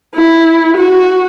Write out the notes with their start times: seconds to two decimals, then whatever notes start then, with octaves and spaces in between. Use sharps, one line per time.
0.15 E4
0.77 F#4